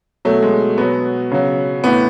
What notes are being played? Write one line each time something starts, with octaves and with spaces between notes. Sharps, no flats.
B2 F#3 A3
G#3
B2 F#3 B3
C#3 F#3
A2 E3 B3